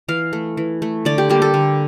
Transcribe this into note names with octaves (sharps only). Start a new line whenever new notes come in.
E3 F5
A3
E3
A3
D3 D5
G4
G3 A#3 G4
A4
D3